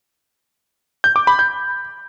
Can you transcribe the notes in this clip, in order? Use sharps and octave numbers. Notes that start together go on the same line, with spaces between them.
G6
D6
B5
G6